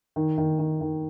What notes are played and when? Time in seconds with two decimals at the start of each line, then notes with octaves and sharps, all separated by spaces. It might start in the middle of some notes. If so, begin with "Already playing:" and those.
0.16 D#3
0.38 D#3
0.59 D#3
0.81 D#3